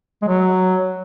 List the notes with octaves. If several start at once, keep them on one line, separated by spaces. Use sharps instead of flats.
G#3
F#3